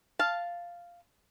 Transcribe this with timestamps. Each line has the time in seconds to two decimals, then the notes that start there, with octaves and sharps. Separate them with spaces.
0.19 F5 A5